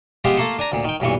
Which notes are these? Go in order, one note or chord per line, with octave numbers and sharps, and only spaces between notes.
F3 G#3 B3 F4 G4
A3 A#3 F4 A4
D4 G#5 A#5
D2 A#2
D#3 G5
B1 G2 A#2 E3 C#6